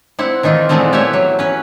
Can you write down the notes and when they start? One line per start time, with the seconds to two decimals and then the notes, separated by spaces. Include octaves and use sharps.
0.19 C4 E4 F#5
0.43 D#3 E3 D#4 F4
0.69 A#2 E3 G#3 A3 B3 C4
0.93 E4 G4 B4 C#5 E5
1.13 F#3
1.39 C#4 B4